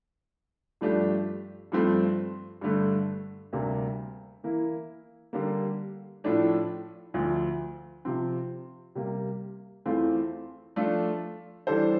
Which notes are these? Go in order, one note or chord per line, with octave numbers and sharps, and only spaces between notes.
G2 F3 A3 D4 G4
G2 F3 A3 C4
G2 D3 A3
D2 C3 G3 A#3 D4
E3 A#3 E4
D3 G3 A#3
A2 F3 A3 D4
D2 D3 F3
C3 F3 C4
C3 G3 A#3
E2 E3 A3 C4 F4
F3 A3 D4 F4 A4
E3 G3 D4 A4 C5